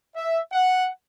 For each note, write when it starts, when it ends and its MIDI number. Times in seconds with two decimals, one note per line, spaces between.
0.16 0.40 76
0.52 0.87 78